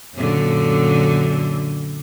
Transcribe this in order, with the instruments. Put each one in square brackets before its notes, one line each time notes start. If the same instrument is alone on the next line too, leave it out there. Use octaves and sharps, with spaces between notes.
[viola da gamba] F#2 A#2 D3